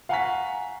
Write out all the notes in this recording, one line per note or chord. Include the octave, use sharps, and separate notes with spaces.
F5 F#5 G#5 A#5 C#6 B6